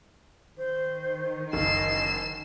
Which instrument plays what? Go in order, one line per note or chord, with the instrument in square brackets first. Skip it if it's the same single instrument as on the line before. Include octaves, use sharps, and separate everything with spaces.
[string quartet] D#3 [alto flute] C5
[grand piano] F#1 [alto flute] D#5 [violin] C7 E7